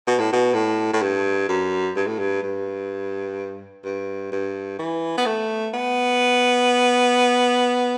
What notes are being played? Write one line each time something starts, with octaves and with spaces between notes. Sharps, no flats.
B2
A2
B2
A2
A2
G2
F#2
G2
A2
G2
G2
G2
G2
E3
B3
A3
B3